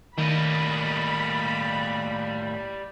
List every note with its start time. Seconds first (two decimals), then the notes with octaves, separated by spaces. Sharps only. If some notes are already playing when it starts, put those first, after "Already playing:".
0.18 A2 D#3 G3 A#3 D#5 B5